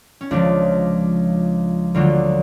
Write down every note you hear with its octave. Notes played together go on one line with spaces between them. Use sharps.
C#4
C#2 C#3 F3 D4
D2 D3 F#3 F4